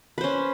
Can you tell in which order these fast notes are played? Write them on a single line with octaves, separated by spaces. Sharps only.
B4 C5 C#4